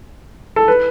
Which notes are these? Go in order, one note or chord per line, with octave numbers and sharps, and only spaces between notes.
A4
B4